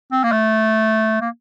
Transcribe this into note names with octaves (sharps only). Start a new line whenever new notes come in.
C4
A#3
A3
A#3